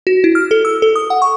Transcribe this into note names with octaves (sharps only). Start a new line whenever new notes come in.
F#4
E4
F6
A4
E6
A4
D#6
F#5
C#6